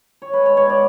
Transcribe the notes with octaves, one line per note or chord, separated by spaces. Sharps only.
C#5
G#3 B4
G#2 C#5
C#5
B3 D5